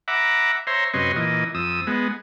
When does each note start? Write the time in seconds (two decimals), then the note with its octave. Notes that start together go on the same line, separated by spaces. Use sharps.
0.08 E5 F#5 A#5 B5 D6
0.67 C5 C#5 E5 A#5 C6
0.94 F#2 C3 B4 C#5 D#5 C6
1.16 A#2 E3 D#5
1.54 F2 D#6 E6
1.87 G#3 B3